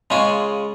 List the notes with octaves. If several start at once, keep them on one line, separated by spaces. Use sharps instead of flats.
C#3 G#3 C#4 F4